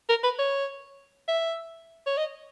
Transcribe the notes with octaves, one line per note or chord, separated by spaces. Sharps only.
A#4
B4
C#5
E5
C#5
D#5